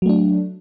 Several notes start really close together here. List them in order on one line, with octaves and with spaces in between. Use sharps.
F#3 A3 D4